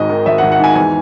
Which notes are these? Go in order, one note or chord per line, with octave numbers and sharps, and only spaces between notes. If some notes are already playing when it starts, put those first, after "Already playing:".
Already playing: G#1 G#2 D#5
D#3
G#1 E5
F#5
G#1
F#5
G#2 G#5
E2 G#5